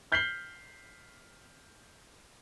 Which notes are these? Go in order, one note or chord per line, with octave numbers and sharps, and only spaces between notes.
F6 G6 B6 C7 F#7 G7